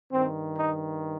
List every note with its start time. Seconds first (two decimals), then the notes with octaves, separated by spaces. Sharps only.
0.11 G2 D#3 C4
0.57 D#4